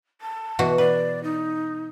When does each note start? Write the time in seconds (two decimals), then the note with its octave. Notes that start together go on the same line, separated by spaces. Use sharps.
0.21 A5
0.59 B2 E3 F#4
0.78 B4 D5
1.23 D#4